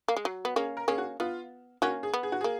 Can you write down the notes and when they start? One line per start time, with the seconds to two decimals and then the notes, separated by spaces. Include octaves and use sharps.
0.08 A#3
0.16 G#3
0.25 F#3
0.45 B3
0.56 A#3 C#4 G#4
0.77 A#4
0.88 A#3 C#4 G#4
0.98 F#4
1.20 B3 F4
1.82 A#3 C#4 F#4
2.03 G#4
2.14 B3
2.23 G#4
2.32 F#4
2.41 A#3 G#4